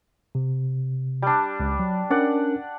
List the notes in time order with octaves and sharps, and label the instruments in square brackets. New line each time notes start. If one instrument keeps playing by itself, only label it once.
[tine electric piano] C3
[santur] G3 D4
[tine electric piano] C#2
F#3
[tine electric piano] C#4 D4 A#4 [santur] D5 F#5